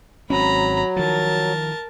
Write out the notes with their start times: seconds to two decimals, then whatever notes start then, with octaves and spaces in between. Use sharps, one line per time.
0.30 G#1 F#3 C4 C#4 A#5 B5
0.96 D#3 F3 A#4 A5